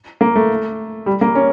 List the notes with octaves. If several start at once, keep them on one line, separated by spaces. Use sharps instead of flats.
A#3
A3
G3
A#3
C#4